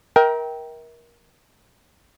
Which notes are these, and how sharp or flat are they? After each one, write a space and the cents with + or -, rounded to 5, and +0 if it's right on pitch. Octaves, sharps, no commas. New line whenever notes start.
A#4 +25 E5 -35 G5 -5